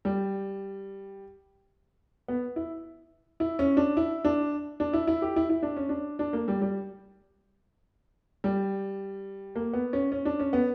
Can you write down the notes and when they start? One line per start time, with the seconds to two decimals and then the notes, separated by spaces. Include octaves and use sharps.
0.05 G3
2.28 B3
2.56 E4
3.40 E4
3.59 C#4
3.77 D4
3.97 E4
4.25 D4
4.80 D4
4.93 E4
5.07 E4
5.22 G4
5.36 E4
5.50 E4
5.63 D4
5.77 C#4
5.89 D4
6.19 D4
6.33 A#3
6.48 G3
6.62 G3
8.44 G3
9.56 A#3
9.73 B3
9.93 C#4
10.12 C#4
10.25 D4
10.40 C#4
10.53 B3